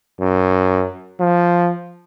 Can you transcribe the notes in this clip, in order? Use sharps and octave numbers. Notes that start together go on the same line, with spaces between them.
F#2
F3